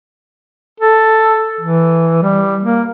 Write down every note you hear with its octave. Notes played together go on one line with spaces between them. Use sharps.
A4
E3
G3
A#3